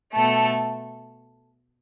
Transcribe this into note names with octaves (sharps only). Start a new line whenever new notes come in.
B2 A3 A4